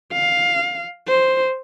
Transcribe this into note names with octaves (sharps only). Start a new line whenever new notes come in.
F5
C5